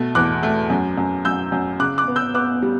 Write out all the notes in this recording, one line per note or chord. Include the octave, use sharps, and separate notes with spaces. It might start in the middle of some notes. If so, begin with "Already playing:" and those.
Already playing: B2 A3
E2 D6 F#6
A3
F#2
F#2
F#2 E6 G6
F#2
C#3 D6 F#6
D6 F#6
B3
E6 G6
B3 D6 F#6
G3